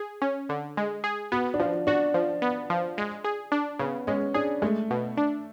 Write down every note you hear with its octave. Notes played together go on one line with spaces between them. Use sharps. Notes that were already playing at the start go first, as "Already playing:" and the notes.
Already playing: G#4
C#4
D3
G#3
G#4
B3 F#4
D4
F3 F4
D4 F#4
F3
B3
F3
G#3
G#4
D4
C#3 B3
G#3 C#4
D4 G#4
G#3 A3
B2
D4